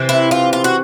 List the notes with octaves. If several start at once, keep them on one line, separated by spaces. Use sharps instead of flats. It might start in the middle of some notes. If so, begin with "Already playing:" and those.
Already playing: C3 E3 C4
E4
F4
F4
F#4